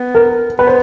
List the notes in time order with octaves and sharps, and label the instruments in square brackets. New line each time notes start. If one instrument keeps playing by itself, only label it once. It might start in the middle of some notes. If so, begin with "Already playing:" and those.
Already playing: [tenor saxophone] B3
[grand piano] A#4
[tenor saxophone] B3 [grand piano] B4
[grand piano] C5